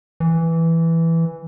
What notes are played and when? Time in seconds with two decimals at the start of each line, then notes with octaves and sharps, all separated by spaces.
0.20 E3